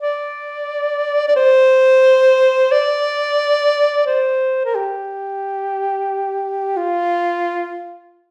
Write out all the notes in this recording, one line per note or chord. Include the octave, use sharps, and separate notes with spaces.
D5
D5
C5
D5
C5
A#4
G4
F4